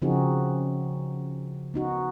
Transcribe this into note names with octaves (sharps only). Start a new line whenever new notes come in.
C#3 F3 C4 D#4 F#4 G#4
B3 D#4 F#4